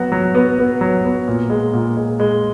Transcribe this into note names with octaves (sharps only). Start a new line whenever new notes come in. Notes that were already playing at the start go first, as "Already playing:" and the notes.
Already playing: F#3 B3 F#4
F#3
B3
B3
F#3
B3
A#2
G#3
A#2
G#3
G#3